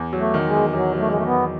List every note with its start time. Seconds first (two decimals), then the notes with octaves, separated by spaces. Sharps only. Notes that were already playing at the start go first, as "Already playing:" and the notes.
Already playing: E2
0.13 F#3
0.19 A3
0.34 D#3
0.47 G#3
0.54 E2
0.73 E2 F#3
0.93 F#3
0.99 A3
1.08 G#3
1.13 D#3 A3
1.26 B3
1.34 E2